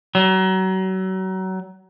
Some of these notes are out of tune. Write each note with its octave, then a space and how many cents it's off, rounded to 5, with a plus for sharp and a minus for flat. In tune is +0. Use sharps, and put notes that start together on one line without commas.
F#3 +30